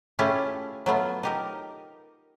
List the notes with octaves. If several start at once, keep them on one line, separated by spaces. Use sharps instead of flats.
A3 C#4 E4 F4 G4 G#4
F#3 A3 B3 F4
D#4 G4 A#4